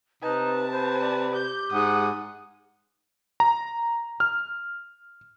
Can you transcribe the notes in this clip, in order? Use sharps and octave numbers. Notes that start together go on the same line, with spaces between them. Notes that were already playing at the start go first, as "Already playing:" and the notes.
C3 D#4 B4 A5
B4 C5
D5
G4 G6
G#2 F#5 D#6
A#5
F6